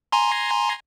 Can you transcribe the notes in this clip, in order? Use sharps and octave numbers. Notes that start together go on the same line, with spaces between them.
G#5 A#5 C6